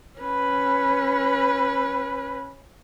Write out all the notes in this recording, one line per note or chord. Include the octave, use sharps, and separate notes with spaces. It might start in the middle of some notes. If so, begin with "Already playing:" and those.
C#4 B4